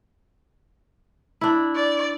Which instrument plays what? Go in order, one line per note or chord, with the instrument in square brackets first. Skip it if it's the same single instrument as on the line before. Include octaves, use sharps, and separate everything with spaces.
[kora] D4 E4
[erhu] D5